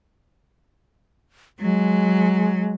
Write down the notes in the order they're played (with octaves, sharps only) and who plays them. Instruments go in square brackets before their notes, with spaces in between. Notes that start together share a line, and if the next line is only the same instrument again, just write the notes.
[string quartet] F#3 [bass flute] G#3